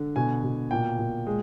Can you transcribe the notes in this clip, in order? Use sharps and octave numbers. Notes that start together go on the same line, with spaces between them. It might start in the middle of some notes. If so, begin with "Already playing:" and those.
Already playing: D3
B2 G#5
B2
A#2 G5
A#2
G#3